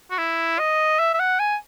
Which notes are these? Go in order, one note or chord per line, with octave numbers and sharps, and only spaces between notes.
F#4
E4
D#5
E5
E5
F#5
G#5